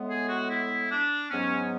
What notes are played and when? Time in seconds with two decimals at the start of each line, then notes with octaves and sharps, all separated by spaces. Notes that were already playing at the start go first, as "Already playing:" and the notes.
Already playing: A2 G#3 B3
0.09 G#4
0.29 F#4
0.50 E4
0.90 D4
1.30 G#2 F#3 B3 C#4